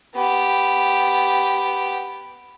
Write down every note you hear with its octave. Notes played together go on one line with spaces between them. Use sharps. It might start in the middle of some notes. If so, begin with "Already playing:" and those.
B3 G4